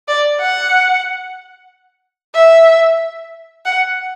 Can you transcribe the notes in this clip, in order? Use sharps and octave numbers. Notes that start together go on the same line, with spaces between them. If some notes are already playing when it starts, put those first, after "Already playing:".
D5
F#5
E5
F#5